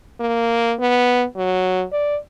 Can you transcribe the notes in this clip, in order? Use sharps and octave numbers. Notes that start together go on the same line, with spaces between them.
A#3
B3
F#3
D5